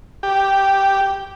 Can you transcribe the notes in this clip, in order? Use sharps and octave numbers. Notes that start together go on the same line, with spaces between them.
G4